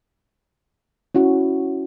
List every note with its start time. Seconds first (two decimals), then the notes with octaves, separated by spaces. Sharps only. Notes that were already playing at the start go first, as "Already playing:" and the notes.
1.15 C#4 E4 F#4